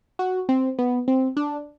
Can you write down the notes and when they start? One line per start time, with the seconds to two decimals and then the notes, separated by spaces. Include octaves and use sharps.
0.19 F#4
0.49 C4
0.79 B3
1.08 C4
1.37 D4